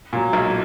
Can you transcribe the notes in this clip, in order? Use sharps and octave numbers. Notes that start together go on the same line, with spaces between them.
A#2 F#3
B1